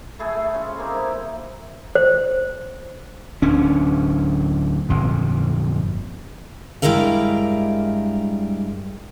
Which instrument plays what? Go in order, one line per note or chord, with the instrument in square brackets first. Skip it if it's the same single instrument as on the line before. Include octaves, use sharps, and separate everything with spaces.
[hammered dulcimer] A3 E4 G#4 A4
A3
G#3 C#4 F4
A#3 C4 G#4 D#5
D#4 E4 G4
[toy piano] C5
[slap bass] D1 C#4 D4
G1 F2 A#2
[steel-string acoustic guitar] G2 G3 G#3 E4 A#4 F5